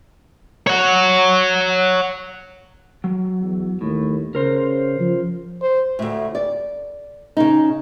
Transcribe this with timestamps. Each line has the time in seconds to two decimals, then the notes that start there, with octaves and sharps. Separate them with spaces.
0.67 C#5 F#5
3.04 F#3
3.41 E2
3.81 D#2 A2
4.35 C#3 A#4 C5
5.00 F3
5.62 C5
5.99 D2 A2
6.35 D5
7.37 C#3 D#4